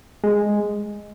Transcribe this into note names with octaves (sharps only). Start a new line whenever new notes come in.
G#3